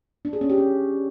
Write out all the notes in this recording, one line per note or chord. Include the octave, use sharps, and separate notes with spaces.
D4
G#4
C#4
G4
C#4